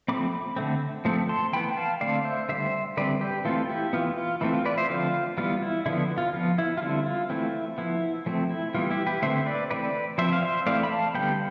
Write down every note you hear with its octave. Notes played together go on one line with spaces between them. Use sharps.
F3 A3 C4 B5 D6
D3 A3 C4
F3 A3 C4
A5 C6
E3 B3 G5 B5
F5 A5
D3 A3 C4 D5 F5
C5 E5
D3 G3 B3 C5 E5
D3 G3 C4 B4 D5
G4 B4
E3 A3 C4 F4 A4
E4 G4
E3 B3 F4
F4
E3 A3 C4 E4
F4
B4 D5
C5 E5
D3 F3 A3 C4 F4
E3 G3 B3 F4
E4
D3 F3 B3 E4
F4
F3 B3 F4
E4
F4
D3 G3 C4 E4
F4
E3 A3 C4 E4
F3 B3 E4
F3 A3 C4
E4
E3 G3 B3 F4
E4 G4
G4 B4
D3 A3 C4 C5 E5
B4 D5
E3 A3 C4 B4 D5
F3 C4 C5 E5
F5
C5 E5
E3 A3 C4 D5 F5
B5
F5 A5
D3 G3 B3 G5 B5